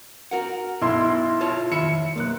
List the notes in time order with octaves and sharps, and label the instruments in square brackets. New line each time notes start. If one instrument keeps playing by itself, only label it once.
[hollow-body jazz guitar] F#4 A#4 F#5
[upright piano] B1 C6 [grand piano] E4
[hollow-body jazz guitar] F4 C#5 A5
[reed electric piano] F2 D#3 [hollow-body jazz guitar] E5 B5 [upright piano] C#7
[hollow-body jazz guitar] B1 F#2 [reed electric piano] A#3 F#6